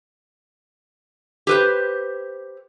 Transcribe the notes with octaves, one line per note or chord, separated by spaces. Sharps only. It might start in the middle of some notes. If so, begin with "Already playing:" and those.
G4 B4 C5